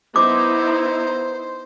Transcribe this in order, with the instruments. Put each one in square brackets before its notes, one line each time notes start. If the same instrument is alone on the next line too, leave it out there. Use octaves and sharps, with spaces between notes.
[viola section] B3 D#4 E4 [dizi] C5 [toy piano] D6